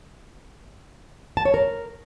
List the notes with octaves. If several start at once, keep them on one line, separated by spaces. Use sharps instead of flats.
A5
C#5
A#4